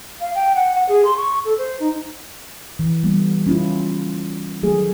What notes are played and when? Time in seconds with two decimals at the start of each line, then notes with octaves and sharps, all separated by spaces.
0.21 F5
0.35 G5
0.56 F#5
0.75 F#5
0.89 G#4
1.05 C6
1.17 C#6
1.45 A4
1.58 C5
1.80 D#4
2.79 E3
3.04 G3 A3 B3
3.47 C#4 E4 F4
4.62 D#3 F#3 A3 G#4